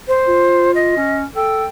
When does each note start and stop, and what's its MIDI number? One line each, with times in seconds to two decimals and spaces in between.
0.08 0.71 72
0.28 0.93 65
0.75 1.17 75
0.97 1.24 61
1.36 1.65 69
1.36 1.67 79